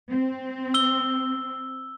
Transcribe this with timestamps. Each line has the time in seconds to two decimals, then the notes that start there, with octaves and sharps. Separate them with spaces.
0.11 C4
0.74 E6 G7